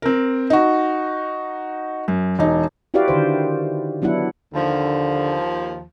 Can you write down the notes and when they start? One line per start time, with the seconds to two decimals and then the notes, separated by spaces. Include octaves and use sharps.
0.02 C4 A#4
0.50 D#4 F#4
2.08 F#2
2.39 E1 D#4
2.94 E4 F#4 G4 B4 D5 F5
3.08 D3 D#3 C5
4.02 F#3 B3 D4 E4 F#5
4.54 D#2 D3 F3